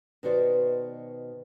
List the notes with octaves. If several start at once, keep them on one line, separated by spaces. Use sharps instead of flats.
B2 D#3 F#4 C5 D5